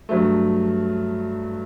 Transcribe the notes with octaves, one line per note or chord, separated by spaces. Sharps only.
G2 F#3 A3